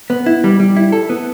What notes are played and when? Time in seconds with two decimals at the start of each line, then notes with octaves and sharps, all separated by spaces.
0.10 B3
0.26 E4
0.44 G3
0.60 G3
0.76 E4
0.92 A4
1.10 B3